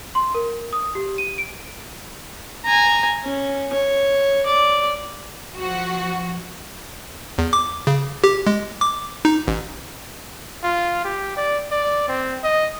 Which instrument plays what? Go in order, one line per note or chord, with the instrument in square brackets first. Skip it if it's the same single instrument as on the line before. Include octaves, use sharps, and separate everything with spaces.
[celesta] C6
A#4
D#6
G4
D#7
D7
[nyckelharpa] G#5 A#5
C#4
C#5
D5
[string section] F3 F#4
[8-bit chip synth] E2
D6
C#3
G4
G#3
D6
D#4
A1
[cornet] F4
G4
D5
D5
C4
D#5